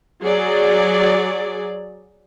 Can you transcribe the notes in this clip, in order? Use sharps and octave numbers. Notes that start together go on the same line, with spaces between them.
F#3 G#4 D5